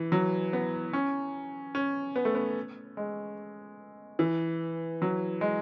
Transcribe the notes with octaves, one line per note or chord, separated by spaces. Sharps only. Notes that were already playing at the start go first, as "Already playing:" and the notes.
Already playing: E3
F#3
B3
C#4
C#4
B3
A3
B3
G#3
E3
F#3
G#3